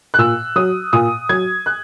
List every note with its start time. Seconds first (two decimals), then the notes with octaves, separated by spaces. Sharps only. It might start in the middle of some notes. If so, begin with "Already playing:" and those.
0.14 F#6
0.18 A#2 E6
0.56 F#3 D#6
0.93 A#2 D#6
1.29 F#3 G#6
1.66 F#6